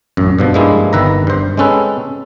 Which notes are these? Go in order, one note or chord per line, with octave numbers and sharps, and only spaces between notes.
A1 F#2
G2 B2 F3
G2 F3 G#3 A#3 E4
G1 D#3 B4 E5 A#5
G2 C5
G#3 C4 C#4 A4 B4